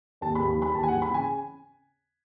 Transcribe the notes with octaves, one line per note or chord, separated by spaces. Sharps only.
D#2 A5
B5
D#2
E3 B5
D#2 A5
G#5
F#5
E3
B5
C#3 G#5